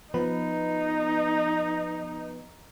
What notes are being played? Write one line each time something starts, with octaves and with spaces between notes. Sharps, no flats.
F3 B3 D#4 B4